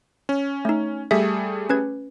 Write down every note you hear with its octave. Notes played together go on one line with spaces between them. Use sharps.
C#4
A3 D#4
G3 A3 G#4 E5
C#4 B4 G#6